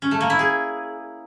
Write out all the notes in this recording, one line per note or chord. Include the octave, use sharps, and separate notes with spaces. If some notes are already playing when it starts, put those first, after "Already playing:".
C#4
A3
A#3
E4
G#4